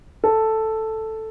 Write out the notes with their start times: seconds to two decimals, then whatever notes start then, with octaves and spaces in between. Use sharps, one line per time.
0.24 A4